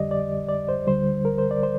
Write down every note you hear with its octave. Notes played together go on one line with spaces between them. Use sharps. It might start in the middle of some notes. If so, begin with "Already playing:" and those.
Already playing: F2 D3 G3 G4 D5 D#5
D5
D5
C5
D2 D3 G3 C5
A#4
C5
D5
C5